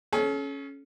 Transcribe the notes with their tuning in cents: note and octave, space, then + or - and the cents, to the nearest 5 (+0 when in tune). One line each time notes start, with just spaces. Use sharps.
C#4 +0 A4 -45